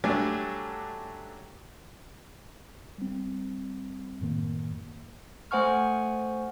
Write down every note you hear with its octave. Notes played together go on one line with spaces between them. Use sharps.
F#3 G3 A3 D4 G#5
G3 C4
F#2 A2 D#3 A#3
A3 C5 F#5 G#5 C#6 F6